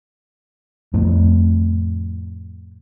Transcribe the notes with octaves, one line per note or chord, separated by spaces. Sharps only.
F2 A2